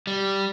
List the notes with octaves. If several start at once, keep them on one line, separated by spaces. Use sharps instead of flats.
G3